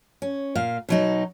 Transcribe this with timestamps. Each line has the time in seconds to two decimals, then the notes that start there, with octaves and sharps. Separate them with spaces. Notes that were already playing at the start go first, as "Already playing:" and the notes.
0.22 C#4
0.55 A#2 F5
0.89 B2 F#3 D#4